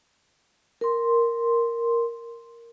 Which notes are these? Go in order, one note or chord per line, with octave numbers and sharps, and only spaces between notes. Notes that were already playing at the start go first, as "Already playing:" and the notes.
A#4 C6